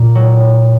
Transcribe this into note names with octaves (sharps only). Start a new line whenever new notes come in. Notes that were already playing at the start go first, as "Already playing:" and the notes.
Already playing: A#2
F#3